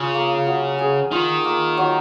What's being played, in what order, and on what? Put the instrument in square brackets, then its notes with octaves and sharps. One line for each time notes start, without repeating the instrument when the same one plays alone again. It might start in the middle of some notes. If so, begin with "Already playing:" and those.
Already playing: [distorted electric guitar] C#3 [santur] F4
[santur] A#3
F#3
G#4
[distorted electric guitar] D#3 [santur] F4
[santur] A#3
F#3